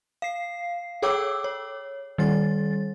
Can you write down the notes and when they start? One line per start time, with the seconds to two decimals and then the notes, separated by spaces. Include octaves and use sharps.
0.22 F5 C7
1.02 G#4 A4 C#5 G5 D6 E6
1.44 C#5
2.18 D#3 G3 A6